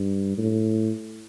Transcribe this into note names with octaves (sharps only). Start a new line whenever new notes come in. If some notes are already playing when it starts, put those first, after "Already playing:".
Already playing: G2
A2